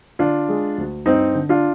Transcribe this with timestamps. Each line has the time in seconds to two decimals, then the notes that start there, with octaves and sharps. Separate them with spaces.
0.19 D3 D4 F4
0.49 G#3
0.78 D2
1.06 G2 C4 D#4
1.35 D3
1.49 D4 F4